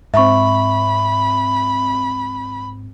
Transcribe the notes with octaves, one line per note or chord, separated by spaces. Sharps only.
G#2 C4 E5 B5 C#6